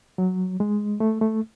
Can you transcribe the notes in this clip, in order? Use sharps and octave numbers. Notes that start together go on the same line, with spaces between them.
F#3
G#3
A3
A3